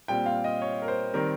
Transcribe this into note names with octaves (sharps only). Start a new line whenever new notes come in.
A#2 G3 C4 G5
F5
D#5
C#5
A#4
C5
D#3 G3 C4 A#4